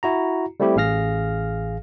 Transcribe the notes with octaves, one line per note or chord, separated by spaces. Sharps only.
E4 F#4 A#5
G3 A3 C4 E4 G4
A1 G#4 F5 F6 A#6